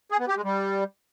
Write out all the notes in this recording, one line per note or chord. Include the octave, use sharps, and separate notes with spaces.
G#4
B3
G4
G#3
G3